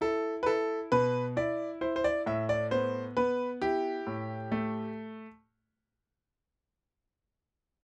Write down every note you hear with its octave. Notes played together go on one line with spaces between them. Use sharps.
E4 A4
B4
E4 A4
B2 B4
E4 D5
E4 C5
C5
D5
A2 E5
D5
B3 C5
B3 B4
E4 G4
A2
A3